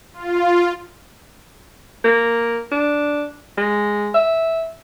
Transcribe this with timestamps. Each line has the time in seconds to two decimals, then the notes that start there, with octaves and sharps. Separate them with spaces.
0.14 F4
2.04 A#3
2.71 D4
3.58 G#3
4.14 E5